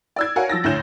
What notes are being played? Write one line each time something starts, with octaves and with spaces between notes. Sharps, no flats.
D5 E6 G#6
F#4 A#4 C#5 F5 F#5 G#5
F3 E6 A6 A#6
D2 A2 D3 C#5 G6 E7